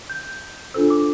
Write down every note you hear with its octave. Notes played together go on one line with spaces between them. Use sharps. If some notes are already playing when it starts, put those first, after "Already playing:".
G6
D4 F4 A4 C5 E6
D6